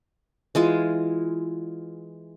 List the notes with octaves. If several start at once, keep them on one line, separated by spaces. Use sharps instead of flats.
E3 G#3 F4